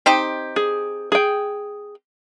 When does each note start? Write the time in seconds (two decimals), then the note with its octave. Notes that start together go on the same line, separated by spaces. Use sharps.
0.06 C4 D#4 G4
0.56 G#4
1.12 G#4 G5